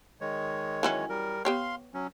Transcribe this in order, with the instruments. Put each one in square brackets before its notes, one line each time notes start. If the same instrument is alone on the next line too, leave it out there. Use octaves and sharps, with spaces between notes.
[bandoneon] D#3 G#3 C#5
[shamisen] E3 F#3 C#4
[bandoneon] G3 A#4
[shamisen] B3 G4 C#5 [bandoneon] F5 C6
[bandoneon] F#3 C#4